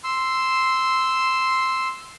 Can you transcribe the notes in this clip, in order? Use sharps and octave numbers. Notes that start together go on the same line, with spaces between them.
C6 E6